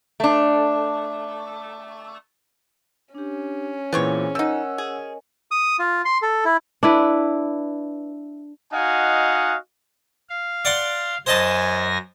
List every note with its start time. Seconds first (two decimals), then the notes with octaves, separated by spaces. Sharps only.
0.20 A3 D4
3.15 C#4 D4 G4
3.93 A#2 E3 B3 C4 E4 G#4 C#5
4.35 F3 D#4 A#4 D#5 F#5 G#5 E6
4.78 G#4
5.51 D#6
5.79 F4
6.05 C6
6.22 A4
6.45 E4
6.83 D4 E4 B4
8.73 D#4 F#4 D#5 F5 F#5 G#5
10.29 F5
10.65 D5 F#5 C6
11.26 F#2 C5 D#5 G#5 A5 A#6